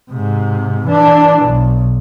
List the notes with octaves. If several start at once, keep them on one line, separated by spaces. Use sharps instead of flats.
G#2 C3
E3 D4
B1